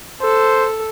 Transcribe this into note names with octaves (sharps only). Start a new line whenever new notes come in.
A4 C5